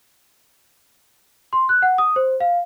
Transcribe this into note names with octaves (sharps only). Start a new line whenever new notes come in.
C6
F#6
F#5
D#6
C5
F5